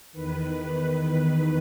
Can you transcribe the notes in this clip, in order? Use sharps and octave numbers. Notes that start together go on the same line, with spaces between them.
E2 D#3 B4